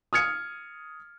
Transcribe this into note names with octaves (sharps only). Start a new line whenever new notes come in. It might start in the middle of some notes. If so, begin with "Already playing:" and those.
D#6 F6 G#6 C#7